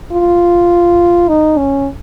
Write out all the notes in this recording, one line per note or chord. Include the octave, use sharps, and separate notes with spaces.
F4
D#4
C#4